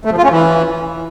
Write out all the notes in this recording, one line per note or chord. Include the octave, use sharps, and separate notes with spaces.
A3
F3
F4
C#4
E3